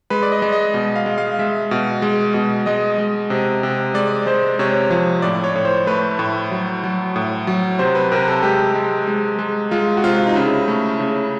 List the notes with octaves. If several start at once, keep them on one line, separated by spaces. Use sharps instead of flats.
G#3 B4
D5
D#5
G#3
D#5
B2
F5
G#3
F5
G#3 E5
B2
G#3
B2
G#3 D#5
G#3
C3
C3
G#3 D5
G#3 C5
C3 C#5
F3
A2 D5
C#5
A2
C5
A3 B4
A2
F#3
F#3
A2
F#3
C3 C5
B4
C3 A#4
A4
G#3 G4
G#3
G#3
G#3
G#3 F4
F#4
C3 F4
D#4
C#3 E4
A3
C#3